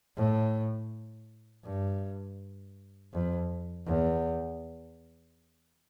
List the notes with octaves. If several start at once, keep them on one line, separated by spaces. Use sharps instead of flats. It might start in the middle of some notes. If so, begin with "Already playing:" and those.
A2
G2
F2
E2